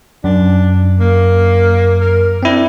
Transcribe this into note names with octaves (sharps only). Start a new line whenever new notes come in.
F#2 D4
A#3
A#4
C4 D4 E4